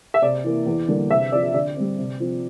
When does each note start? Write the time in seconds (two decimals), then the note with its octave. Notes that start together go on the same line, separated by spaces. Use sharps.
0.14 E5
0.22 C3 D5
0.44 E3 A#3
0.66 E2
0.88 D3 G3 A#3 D4
1.10 C3 E5
1.32 F3 C4 D5
1.54 D3 D5
1.77 G3 C4
1.99 C3
2.20 F3 C4